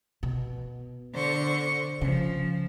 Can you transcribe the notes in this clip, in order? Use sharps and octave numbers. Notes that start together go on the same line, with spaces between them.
B2
D3 C5 C#6
C#3 F3